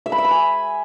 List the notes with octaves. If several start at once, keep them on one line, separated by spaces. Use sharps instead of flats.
E5
B5
E5
B5
G#5